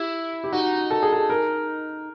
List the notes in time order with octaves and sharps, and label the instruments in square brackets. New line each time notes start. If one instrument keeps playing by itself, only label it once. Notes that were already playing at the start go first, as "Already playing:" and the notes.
Already playing: [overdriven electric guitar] E4 [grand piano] G4
[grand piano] G4
[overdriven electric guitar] D#4 [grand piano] F#4
[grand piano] A4
G#4
A4
A#4